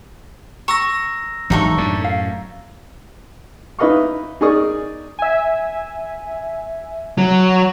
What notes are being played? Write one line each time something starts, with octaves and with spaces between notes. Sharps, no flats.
A#5 C#6 E6 A#6
G#1 E3 F#3 D4 D#4 A4 C#6
F#2 A2 D4
F5
D#4 E4 B4 D#5 F5 C#6
D#4 G#4 A#4 D5 C#6 D#6
E5 G#5
F#3